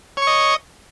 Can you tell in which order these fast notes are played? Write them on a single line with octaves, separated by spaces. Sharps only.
C#5 C#6 D#5